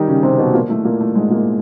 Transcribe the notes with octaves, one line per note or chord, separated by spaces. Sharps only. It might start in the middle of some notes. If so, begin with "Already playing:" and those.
Already playing: D#3 G3 D#4 G4
C#3 C#4
C3 C4
B2 B3
A#2 A#3
A2 A3
A#2 A#3
A2 A3
G#2 G#3
A#2 A#3